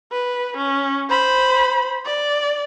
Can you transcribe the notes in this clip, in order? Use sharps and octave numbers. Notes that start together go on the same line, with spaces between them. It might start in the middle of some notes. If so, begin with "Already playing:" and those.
B4
C#4
C5 B5
D5